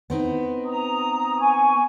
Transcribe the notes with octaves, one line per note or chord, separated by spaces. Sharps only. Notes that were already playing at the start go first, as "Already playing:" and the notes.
B3 C4 D#4
A#5 D#6
G#5 C#6